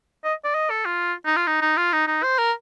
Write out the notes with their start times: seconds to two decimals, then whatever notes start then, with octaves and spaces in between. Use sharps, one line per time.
0.24 D#5
0.45 D5
0.55 D#5
0.70 A4
0.86 F4
1.26 D#4
1.36 F4
1.47 D#4
1.61 D#4
1.77 F4
1.93 D#4
2.07 D#4
2.23 C5
2.38 A#4